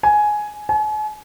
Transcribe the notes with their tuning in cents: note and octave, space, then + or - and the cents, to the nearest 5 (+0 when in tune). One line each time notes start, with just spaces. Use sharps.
G#5 +10
G#5 +45